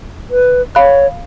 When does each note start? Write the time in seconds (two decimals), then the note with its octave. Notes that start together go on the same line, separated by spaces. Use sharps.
0.31 B4
0.75 C#5 F5 B5 F#6